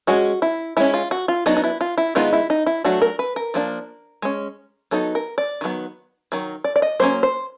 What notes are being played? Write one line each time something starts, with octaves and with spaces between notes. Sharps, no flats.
G#3 C#4 F#4
E4
G#3 C#4 E4
F4
F#4
F4
F#3 B3 D4 D#4
D#4
E4
F4
E4
D#3 G#3 B3 D#4 F4
E4
D#4
E4
F#3 A3 D4 F#4
A#4
B4
A#4
F3 A#3 D4
G#3 C#4
F#3 B3 D#4 A4
A#4
D5
D#3 F#3 B3
D#3 F#3
D5
D5
D#5
F#3 A#3 C#4 C5
C5